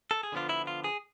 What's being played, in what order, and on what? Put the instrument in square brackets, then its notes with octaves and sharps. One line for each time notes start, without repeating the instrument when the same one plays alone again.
[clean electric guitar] A4
G#4
D3 F3 B3 D4 F4
E4
F4
G#4